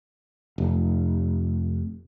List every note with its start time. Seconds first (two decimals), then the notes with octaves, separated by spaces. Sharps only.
0.58 F1